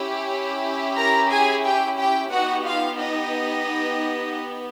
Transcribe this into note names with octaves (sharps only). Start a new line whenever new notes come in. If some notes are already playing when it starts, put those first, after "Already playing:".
Already playing: C#4 E4 G4
A#4 A#5
G#4 G#5
G4 G5
G4 G5
B3 D#4 F#4 G4 F#5
F4 F5
D#4 D#5